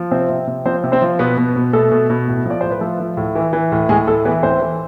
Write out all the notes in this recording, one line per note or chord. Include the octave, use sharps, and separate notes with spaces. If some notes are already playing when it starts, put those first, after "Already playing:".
Already playing: F3
C3 C4 C5
C3
C3
F3 C4 C5
C3
C4 C5
F3
B2 B3 B4
B2
B2
B2 A3 A4
B2
B2
A2
F3 D5
A2 C5
B4
F3 A3 A4
F3
A2
E3
E3
A2
A2 G#3 G#4
A2 A3 A4
E3 B3 B4
A2 C4 C5
E3